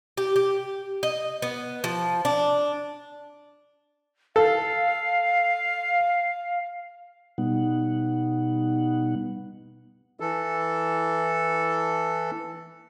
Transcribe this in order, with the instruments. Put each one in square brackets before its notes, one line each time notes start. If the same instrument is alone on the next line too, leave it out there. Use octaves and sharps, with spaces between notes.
[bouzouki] G4
G4
D#5
B3
F3
D4
[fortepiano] A4 [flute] F5
[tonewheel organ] B2 G3 B3 D#4 F#5
[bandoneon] E3 A4